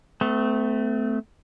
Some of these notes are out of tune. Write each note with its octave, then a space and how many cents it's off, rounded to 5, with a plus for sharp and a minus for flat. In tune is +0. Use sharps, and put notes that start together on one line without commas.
A3 +0 C4 -45